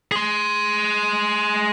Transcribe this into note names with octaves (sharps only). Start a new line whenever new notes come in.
G#4 C6